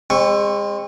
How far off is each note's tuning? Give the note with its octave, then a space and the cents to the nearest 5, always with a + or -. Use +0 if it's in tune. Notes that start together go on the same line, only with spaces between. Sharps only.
G#3 -35 C4 +25 C#6 +0